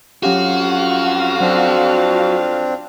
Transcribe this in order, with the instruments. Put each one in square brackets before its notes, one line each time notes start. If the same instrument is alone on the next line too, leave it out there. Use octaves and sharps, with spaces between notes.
[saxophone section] F2 F5 [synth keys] F#3 C#4 G4 [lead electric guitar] F#4
[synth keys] F#3 [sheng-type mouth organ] C4 D4